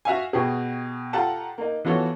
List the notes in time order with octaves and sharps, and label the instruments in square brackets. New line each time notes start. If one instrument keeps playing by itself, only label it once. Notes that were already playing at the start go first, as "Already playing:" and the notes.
[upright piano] F#4 E5 F5 G#5
B2 G4 G#4
F4 G4 A4 F#5 A5 A#5
A#3 D#4
E3 B3 F4 F#4 A4 C#5